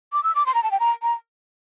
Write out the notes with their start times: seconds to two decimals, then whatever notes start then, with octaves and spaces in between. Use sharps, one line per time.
0.13 D6
0.24 E6
0.35 D6
0.46 C6
0.55 A#5
0.63 A5
0.71 G5
0.80 A#5
1.02 A#5